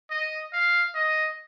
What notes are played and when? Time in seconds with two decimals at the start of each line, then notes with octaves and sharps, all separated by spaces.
0.11 D#5
0.53 F5
0.95 D#5